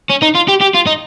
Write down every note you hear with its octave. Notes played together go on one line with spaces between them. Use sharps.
C#4
D#4
F4
G4
G4
F4
D#4